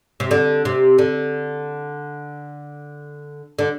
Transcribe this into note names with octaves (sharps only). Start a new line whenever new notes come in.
C3
D3
C3
D3
D3